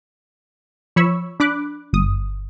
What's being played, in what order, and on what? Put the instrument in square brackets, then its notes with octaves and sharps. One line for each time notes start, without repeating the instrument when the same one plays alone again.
[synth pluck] F3 C#5 B5 C#6 E6
D4 B5 D6 F#6
G1 D#6